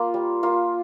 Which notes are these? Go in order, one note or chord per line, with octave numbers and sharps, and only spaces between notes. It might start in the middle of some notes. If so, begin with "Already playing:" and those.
Already playing: A#3 F4
G3
A#3 F4